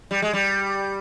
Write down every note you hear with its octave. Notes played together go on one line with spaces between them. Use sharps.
G3
G#3
G3